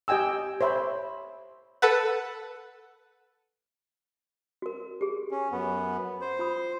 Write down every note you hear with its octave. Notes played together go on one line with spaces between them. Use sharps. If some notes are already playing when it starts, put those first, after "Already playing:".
G4 D#5 G5 G#5 E6
C5 C#5 E5 B5
A4 B4 F#5
F#4 A#4
G4 G#4
C#4
F#2 B3
C5
F4 B5 D#6